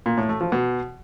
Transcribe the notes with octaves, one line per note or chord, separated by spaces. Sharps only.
A#2
A2
A3
F3
B2